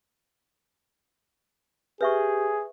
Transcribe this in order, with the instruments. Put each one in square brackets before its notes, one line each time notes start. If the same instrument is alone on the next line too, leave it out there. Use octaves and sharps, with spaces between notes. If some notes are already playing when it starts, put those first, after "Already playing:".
[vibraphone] G4 [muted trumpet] G#4 [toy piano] B4 E5 C#6